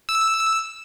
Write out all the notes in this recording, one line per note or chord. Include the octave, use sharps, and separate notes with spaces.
E6